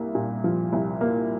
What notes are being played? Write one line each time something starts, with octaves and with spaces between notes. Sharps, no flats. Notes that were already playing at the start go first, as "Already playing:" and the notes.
Already playing: C2 A#3
A#2
F3
C2
A#3